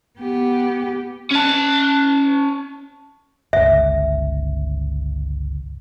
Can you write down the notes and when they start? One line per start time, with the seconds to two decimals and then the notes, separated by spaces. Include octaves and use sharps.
0.19 B3 G4
1.31 C#4 A5
3.53 G1 C#2 E5